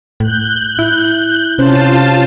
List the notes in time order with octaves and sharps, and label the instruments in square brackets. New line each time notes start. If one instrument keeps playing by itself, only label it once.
[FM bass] A2 [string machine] F#6 G6
[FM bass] E4
[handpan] C3 C#4 C5 [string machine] F4 A5